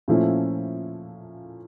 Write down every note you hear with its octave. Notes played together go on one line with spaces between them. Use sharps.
A#2 F3 A3 C#4 E4